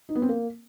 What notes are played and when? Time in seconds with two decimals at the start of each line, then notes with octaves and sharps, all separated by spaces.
0.09 D#4
0.15 B3
0.22 C4
0.29 A#3